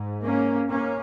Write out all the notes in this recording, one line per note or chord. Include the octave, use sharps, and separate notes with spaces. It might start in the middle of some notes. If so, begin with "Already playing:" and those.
Already playing: G#2
A#3 C#4
A#3 C#4